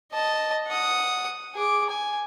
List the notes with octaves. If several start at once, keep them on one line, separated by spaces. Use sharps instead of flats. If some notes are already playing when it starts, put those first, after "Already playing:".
D#5 A5
F#5 D#6
G#4 D6
G#5